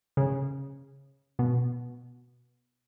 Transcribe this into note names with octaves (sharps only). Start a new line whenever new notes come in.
C#3
B2